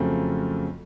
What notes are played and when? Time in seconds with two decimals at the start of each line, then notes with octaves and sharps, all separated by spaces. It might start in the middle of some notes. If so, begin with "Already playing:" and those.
Already playing: F2 C#3 F#3 A3 C4